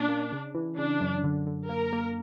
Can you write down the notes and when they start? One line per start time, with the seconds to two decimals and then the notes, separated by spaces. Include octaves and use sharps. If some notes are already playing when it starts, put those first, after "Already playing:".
Already playing: A#2 C#4 D4
0.08 A#3
0.32 C#3
0.55 E3
0.77 C#3 D4
1.00 F#2
1.24 D3
1.46 D3
1.69 A#3 A#4
1.93 A#3